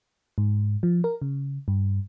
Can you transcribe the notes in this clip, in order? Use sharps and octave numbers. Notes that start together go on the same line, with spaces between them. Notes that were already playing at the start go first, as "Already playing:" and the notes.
G#2
F3
A#4
C#3
G2